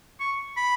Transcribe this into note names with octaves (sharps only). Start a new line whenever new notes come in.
C#6
B5